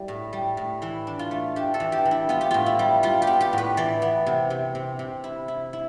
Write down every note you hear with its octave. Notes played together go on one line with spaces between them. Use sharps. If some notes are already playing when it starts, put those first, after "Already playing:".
Already playing: G3 E4
A2
G3
A2
E3 E4
D4
F4
A3
D4 G4
A4
E3
G4
E3
E4
B3 F4
G4
A2 F4
E4
G3
G3 F4
G4
B3
G4
A2 B4
E3 D5
B3
C3
C3
C3
C3
E4
E4
E4